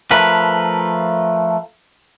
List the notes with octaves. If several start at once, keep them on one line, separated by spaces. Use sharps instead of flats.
F3 A3 A#4 B4